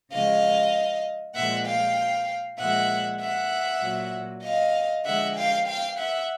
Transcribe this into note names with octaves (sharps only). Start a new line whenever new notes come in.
C#3 F3 G#3 D#5 F5
A#2 F3 G#3 E5 F#5
F5 G5
A#2 F3 G#3 E5 F#5
E5 F#5
A#2 F#3
D#5 F5
D3 F3 G#3 E5 F#5
F5 G5
F5 G5
E5 F#5